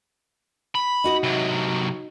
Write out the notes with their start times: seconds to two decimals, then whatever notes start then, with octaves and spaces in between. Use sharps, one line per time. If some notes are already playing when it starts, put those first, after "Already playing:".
0.75 B5
1.04 D#4 F#4 D#5
1.23 C3 F#3